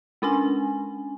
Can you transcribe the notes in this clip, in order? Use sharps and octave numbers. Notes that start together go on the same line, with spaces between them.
G#3 C#4 D4 G#5